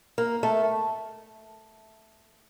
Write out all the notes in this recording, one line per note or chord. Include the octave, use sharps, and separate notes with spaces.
A#3
A3